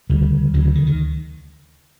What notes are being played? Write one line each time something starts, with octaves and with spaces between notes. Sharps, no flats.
D2 C#3 G3
D2 C#3 F#3
D#3
D#3